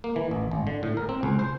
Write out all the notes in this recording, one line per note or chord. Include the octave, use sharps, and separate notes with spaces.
A#3
E3
A1
G#1
D3
A2
A#4
C4
C#2
C5